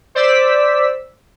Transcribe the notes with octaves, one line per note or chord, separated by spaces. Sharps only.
C5 D5 E6 B6